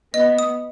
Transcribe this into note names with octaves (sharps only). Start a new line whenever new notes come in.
B3 D#5
D#6